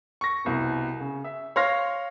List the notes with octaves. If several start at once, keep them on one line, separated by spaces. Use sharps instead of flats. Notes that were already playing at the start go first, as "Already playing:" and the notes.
C#6 A#6
C2 B2
C#3
E5
C#5 F5 C6 F6 A#6